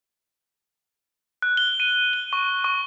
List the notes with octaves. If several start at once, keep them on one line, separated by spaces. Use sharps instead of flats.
F#6
G7
D#7
G7
C#6
C#6